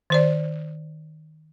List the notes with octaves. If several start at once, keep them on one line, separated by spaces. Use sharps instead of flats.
D#3 C5 D5